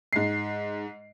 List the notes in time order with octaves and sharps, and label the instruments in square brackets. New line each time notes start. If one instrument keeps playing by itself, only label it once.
[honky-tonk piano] G#2 C7